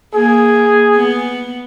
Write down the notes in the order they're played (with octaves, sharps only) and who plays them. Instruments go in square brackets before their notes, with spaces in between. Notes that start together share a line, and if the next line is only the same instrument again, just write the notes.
[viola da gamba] A#3 [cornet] G#4
[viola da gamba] B3